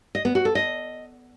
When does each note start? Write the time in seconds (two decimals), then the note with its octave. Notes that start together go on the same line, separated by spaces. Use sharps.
0.15 D#5
0.25 B3
0.35 F#4
0.45 A4
0.55 D#5